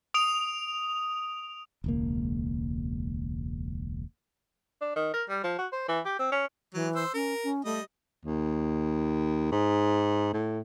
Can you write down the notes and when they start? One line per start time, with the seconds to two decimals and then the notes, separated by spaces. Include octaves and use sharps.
0.14 D#6 D7 F7
1.84 E1 C#2 A#3
4.81 D4
4.96 D#3
5.14 A#4
5.29 G3
5.44 F3
5.58 F#4
5.72 C5
5.88 E3
6.05 G4
6.19 C4
6.32 C#4
6.74 E3 F#3
6.95 C5 E6
7.14 C#4 A#4
7.44 C#4
7.65 G3 A3 D#5
8.25 D#2
9.52 G#2
10.33 A2